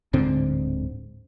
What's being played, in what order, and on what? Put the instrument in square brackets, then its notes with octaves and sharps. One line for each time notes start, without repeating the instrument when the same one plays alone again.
[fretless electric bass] D1 G#2 D3 C4